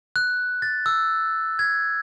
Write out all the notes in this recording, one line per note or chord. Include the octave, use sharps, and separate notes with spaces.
F#6
A6
E6
G#6